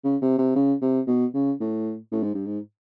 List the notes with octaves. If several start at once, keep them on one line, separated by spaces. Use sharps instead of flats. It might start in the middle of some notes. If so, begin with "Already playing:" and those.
C#3
C3
C3
C#3
C3
B2
C#3
A2
A2
G#2
G2
G#2